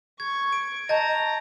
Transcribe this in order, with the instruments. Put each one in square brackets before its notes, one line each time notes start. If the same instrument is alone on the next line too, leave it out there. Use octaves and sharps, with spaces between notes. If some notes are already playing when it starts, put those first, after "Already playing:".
[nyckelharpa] C#6 [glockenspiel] G#6
[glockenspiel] D7
[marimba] D#5 [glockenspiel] A5 G6 A6 [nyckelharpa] A#5